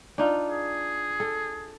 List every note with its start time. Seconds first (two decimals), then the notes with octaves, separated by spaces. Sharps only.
0.18 D4 D#4 F4
0.50 G#4
1.20 A4